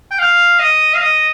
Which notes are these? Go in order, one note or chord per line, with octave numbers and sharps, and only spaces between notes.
G5
F5
D#5
F5
D#5